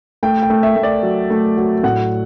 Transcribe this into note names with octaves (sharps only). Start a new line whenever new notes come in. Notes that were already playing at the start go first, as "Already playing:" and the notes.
A3 G5
G5
A3
E5
A3
D5
F#3
A3
F#3
A2 F#5